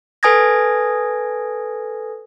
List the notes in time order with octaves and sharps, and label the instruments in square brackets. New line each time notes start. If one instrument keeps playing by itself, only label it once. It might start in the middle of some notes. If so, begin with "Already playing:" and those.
[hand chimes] A4 B4 G#5 D#6 G#6 A#6